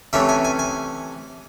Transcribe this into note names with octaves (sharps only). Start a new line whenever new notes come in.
C3 E3 A3 C#4 E5
G#5
G#5
G#5